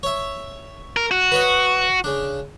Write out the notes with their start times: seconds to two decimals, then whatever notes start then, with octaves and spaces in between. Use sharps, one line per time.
0.03 C#5 E5
0.97 A#4
1.11 F#4
1.32 B4 C#5 D#5
2.04 C#3 D4